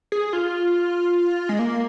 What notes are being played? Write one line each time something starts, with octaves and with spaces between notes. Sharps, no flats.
G#4
F4
G#3
A#3